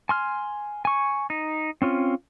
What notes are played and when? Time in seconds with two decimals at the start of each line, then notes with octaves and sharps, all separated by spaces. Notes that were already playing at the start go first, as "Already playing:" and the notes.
0.09 G#5 C6 F6
0.85 G#5 C#6
1.30 D#4
1.82 C4 C#4 F4